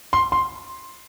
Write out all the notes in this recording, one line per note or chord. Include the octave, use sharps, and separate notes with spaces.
C6
C6